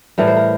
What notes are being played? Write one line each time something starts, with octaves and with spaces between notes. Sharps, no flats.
A2 E3 G3 A#4
C5
A#4